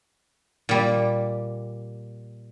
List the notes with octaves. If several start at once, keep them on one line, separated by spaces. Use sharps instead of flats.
A#2 G3